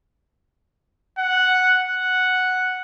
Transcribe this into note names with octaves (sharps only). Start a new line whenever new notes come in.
F#5
F#5